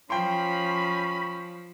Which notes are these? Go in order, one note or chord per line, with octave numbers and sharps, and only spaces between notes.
F3 C#4 G5 B5 C6